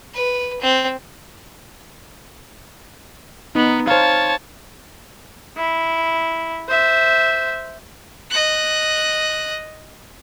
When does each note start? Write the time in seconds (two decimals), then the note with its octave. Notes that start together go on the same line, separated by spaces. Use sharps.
0.14 B4
0.61 C4
3.55 B3 D#4
3.88 C5 C#5 F5 A5
5.57 E4
6.68 C5 E5
8.31 D#5 F#6